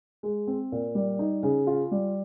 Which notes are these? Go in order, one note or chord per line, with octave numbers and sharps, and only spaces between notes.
G#3
C4
A#2
G3
D#4
C#3
F4
G3